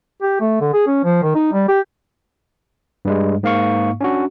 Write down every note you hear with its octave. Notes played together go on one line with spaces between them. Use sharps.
G4
A3
D3
G#4
C#4
F3
D#3
D#4
G3
G4
G2 G3 G#3
G#2 A#3 F5 C#6
C#4 D4 F#4